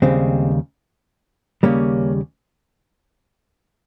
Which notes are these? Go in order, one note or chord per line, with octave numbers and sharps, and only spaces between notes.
D#2 C#3 G3 G#3 C4
D#2 C#3 G3 A#3 C#4